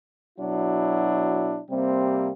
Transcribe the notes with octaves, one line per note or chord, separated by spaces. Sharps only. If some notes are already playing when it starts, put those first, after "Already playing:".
B2 F#3 D4 E4
C3 G3 A#3 C4